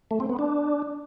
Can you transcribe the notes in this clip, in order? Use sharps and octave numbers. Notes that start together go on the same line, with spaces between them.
A3
C4
B3
D4